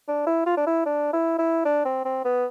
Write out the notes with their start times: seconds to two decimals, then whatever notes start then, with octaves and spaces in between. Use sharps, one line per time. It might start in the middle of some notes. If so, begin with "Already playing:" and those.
0.08 D4
0.27 E4
0.46 F4
0.57 D4
0.67 E4
0.86 D4
1.13 E4
1.39 E4
1.65 D4
1.85 C4
2.05 C4
2.25 B3